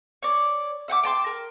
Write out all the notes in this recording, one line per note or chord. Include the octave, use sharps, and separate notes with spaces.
C#5 D5
E5 F#5 G5 D6
G5 A5 C6 D6
A#4